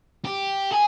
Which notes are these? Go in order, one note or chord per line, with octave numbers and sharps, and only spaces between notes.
G4
G#4